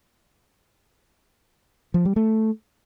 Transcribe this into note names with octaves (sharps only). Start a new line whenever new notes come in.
F3
G3
A3